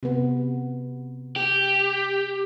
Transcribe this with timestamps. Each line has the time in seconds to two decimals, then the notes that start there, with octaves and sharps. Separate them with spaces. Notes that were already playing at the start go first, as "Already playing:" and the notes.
0.03 C3 B3
1.36 G4